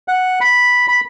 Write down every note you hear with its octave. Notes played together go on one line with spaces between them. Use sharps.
F#5
B5
B5